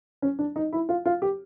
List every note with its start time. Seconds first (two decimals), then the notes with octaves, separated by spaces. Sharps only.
0.22 C#4
0.39 D4
0.56 D#4
0.73 E4
0.89 F4
1.06 F4
1.22 G4